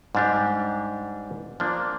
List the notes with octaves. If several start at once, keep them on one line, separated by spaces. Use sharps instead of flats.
G#2 G3 D4 G4
F3 A#3 D4